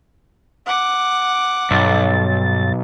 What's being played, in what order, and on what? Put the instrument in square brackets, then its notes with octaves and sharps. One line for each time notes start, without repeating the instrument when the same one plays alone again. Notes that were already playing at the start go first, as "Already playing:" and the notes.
[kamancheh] F#5 D6
[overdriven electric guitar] B1 [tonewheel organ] G2 A6